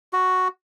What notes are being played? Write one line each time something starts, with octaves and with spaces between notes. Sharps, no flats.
F#4